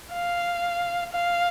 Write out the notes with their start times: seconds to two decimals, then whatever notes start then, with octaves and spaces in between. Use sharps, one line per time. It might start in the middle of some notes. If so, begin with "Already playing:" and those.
0.13 F5
1.13 F5